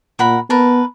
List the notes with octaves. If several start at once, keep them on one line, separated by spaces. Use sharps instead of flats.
A#2 A#4 F#5 B5
B3 A#4 B4 A5